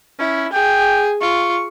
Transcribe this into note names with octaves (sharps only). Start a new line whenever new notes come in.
C#4 E4
G#4 G5
F4 C#6